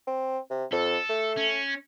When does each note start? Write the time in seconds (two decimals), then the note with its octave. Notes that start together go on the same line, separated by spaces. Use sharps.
0.07 C4
0.51 C3
0.72 F2 A4
1.09 A3
1.36 C#4